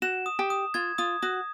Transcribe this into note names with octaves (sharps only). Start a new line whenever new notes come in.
F#4 E7
D#6
G4
D#6
F4 G#6
F4 D#6
F#4 D#6